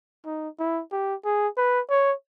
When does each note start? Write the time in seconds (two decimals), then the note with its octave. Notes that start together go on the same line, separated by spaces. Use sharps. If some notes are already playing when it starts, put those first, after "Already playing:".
0.26 D#4
0.59 E4
0.92 G4
1.25 G#4
1.57 B4
1.90 C#5